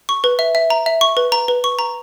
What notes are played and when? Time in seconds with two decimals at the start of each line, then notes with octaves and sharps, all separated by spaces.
0.09 C#6
0.24 B4
0.39 E5
0.55 E5
0.70 A#5
0.86 E5
1.01 C#6
1.17 B4
1.32 A#5
1.48 B4
1.64 C#6
1.79 A#5